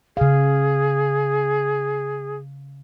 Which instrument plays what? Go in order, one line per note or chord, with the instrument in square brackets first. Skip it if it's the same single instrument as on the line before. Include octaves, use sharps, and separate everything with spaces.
[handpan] C#3 F5 [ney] G#4